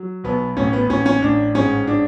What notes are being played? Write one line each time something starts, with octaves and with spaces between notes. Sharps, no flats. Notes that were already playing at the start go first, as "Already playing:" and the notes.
Already playing: F#3
B1 B3
A1 C#4
B3
A1 C#4
C#4
A1 D4
G#2 C#4
D4